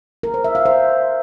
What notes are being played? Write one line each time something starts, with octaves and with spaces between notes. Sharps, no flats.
A#4
C5
E5
F5
C5